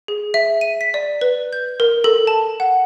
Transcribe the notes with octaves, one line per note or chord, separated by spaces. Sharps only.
G#4
E5
D#7
B6
D5
B4
G6
A#4
A4
A5
F#5